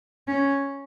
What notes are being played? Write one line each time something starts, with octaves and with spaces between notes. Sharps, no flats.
C#4